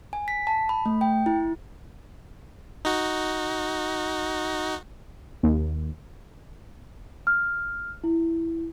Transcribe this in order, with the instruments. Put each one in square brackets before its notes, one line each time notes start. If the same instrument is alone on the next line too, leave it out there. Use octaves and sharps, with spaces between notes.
[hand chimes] G#5
B6
A5
B5
A3
G5
E4
[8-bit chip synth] D#4 F#4
[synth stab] D#2
[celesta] F6
E4